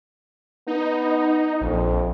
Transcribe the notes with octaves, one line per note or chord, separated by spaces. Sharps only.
B3 D#4
A#1 F2